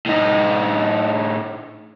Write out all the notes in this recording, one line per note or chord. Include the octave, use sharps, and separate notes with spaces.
A2 D#4